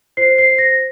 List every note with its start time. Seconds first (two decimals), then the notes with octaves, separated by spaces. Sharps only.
0.17 F4 C5 C7
0.38 C7
0.58 A#6